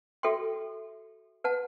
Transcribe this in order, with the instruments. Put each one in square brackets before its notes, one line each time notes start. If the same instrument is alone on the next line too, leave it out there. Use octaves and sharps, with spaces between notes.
[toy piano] F#4 A4 E5 G5 C6
B4 F#5 A5